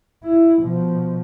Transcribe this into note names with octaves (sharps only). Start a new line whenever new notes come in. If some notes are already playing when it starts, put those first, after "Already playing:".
E4
B2 F3